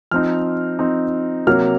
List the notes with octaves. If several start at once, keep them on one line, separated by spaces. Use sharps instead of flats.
F3 C4 D#4 F6
F3 C4 D#4
C3 F#3 A#3 F6